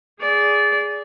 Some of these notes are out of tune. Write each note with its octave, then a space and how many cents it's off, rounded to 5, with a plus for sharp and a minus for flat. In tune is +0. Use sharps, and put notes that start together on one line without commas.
G#4 +0 D5 -20